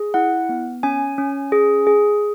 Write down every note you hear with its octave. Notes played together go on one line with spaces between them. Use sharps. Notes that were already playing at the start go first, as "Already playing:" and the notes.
Already playing: G#4
E4 F#5
B3
C#4 G#5
C#4
G#4
G#4